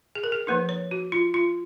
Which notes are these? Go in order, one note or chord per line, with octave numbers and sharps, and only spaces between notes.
G#4
A#4
G#4
F3 A#3 D#4 B4
C#5
F#4
F4
F4